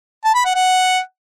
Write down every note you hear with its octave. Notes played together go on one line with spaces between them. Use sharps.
A5
B5
F#5
F#5